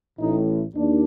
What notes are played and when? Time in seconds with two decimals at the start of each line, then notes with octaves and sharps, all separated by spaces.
0.19 A1 A2 D#4
0.74 D#2 D4